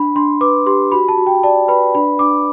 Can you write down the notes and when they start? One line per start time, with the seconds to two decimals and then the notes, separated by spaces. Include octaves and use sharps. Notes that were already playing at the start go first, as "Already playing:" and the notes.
Already playing: D4 B5
0.15 D4 C6
0.41 B4 D6
0.66 G4 C6
0.92 F#4 B5
1.09 A5
1.18 F#4
1.27 G5
1.43 D5 A5
1.68 B4 B5
1.95 D4 B5
2.19 D4 D6